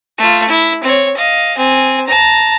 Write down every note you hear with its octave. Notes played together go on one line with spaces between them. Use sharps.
A3 F4
E4
C4 C#5
D#5 F5
C4 G#5
A5 A#5